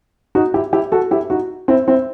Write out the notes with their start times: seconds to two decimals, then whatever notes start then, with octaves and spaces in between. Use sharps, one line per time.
0.35 D#4 F#4
0.54 E4 G4
0.73 E4 G4
0.92 F#4 A4
1.11 E4 G4
1.30 D#4 F#4
1.68 C4 E4
1.88 C4 E4